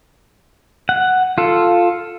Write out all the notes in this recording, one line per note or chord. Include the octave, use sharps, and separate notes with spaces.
F#5
F4 A4